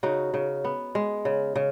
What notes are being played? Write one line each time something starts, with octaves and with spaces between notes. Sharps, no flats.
C#3 D#4 F#4
C#3
B3
G#3
C#3
C#3